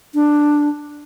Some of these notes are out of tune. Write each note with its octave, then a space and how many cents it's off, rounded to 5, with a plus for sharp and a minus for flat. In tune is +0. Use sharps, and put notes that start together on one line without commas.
D4 +5